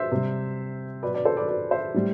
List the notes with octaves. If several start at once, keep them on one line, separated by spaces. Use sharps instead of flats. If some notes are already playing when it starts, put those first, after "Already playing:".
Already playing: C5 E5
C3 G3
B2 F#3 B4 D5
B4 D5
A4 C5
B4 D5
B4 D5
C5 E5
A2 G3